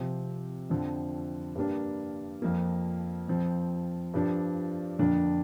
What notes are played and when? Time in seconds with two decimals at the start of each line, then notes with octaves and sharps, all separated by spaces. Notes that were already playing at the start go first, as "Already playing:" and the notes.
Already playing: C3 F3 C4
0.70 F2 D3 F3 C4
1.55 G2 G3 A#3 D4
2.42 F2 F3 A#3
3.28 F2 F3 C4
4.14 G2 F3 D4
4.99 F2 D3 A#3 D4